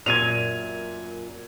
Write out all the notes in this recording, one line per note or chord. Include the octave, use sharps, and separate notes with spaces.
F#2 A#2 G#6 D#7 F7